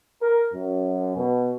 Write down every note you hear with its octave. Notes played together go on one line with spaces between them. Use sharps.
A#4
F#2
B2